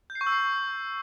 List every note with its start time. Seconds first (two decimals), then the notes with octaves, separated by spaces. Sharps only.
0.10 G6
0.15 C7
0.21 C#6
0.27 E6
0.32 C7